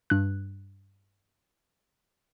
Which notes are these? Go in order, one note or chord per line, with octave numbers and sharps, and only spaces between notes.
G2 F#6